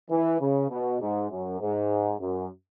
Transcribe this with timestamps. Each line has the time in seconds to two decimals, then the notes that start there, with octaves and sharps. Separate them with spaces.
0.11 E3
0.40 C#3
0.70 B2
1.01 G#2
1.30 F#2
1.60 G#2
2.20 F#2